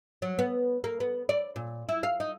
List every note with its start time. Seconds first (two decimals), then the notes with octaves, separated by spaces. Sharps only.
0.22 F#3
0.39 B3
0.84 A#3
1.00 B3
1.29 D5
1.56 A#2
1.89 E4
2.03 F5
2.20 D#4